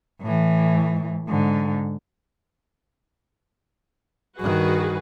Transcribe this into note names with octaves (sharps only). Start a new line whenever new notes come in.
A2 E3
G#2 D3
G2 D#3 F#4 G#4 B4